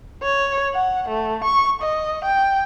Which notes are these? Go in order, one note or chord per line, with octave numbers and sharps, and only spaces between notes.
C#5
F#5
A3
C#6
D#5
G5